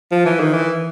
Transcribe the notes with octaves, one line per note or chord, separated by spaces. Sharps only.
F3
E3
D#3
E3